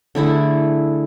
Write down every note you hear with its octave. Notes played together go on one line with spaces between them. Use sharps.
D3 A3 E4 G#4